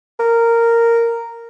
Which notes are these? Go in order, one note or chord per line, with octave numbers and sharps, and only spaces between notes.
A#4